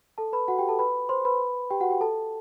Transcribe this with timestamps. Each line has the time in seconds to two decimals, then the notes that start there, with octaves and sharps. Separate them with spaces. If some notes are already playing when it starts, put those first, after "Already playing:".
0.18 A4 A5
0.33 B4 B5
0.48 F#4 F#5
0.58 G4 G5
0.69 A4 A5
0.79 B4 B5
1.09 C5 C6
1.25 B4 B5
1.70 G4 G5
1.81 F#4 F#5
1.90 G4 G5
2.01 A4 A5